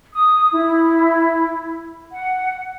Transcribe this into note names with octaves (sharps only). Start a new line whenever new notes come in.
D#6
E4
F#5